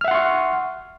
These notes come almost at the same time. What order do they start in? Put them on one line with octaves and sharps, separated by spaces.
F6 E5 F#5 C6 C#6